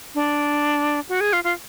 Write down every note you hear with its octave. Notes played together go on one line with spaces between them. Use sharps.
D4
F#4
G#4
F4
F4